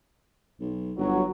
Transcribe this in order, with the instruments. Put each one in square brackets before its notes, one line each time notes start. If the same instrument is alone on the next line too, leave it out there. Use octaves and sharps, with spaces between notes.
[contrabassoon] B1
[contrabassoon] G1 [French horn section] F#3